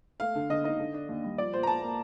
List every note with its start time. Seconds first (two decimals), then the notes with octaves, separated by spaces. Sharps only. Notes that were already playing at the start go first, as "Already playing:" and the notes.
0.20 A3 F5
0.35 D3
0.50 D3 D#5
0.64 D#4 D#5
0.79 D3
0.94 D4
1.09 D#2
1.24 G3
1.38 F3 D5
1.53 A#2 C5
1.63 A#5
1.67 A#2 A5
1.83 A#3